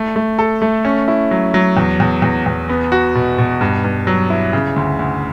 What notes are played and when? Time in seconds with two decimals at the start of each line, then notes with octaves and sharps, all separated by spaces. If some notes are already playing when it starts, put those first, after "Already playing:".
Already playing: A3
0.16 A3
0.39 A4
0.62 A3
0.85 C#4
1.08 E4
1.31 F#3
1.54 F#3
1.77 E2
2.00 E2
2.22 E2
2.46 E2
2.69 B3
2.92 F#4
3.15 B2
3.38 B2
3.61 G2
3.84 G2
4.07 F#3
4.30 E4
4.53 C#3
4.76 D2
4.99 D2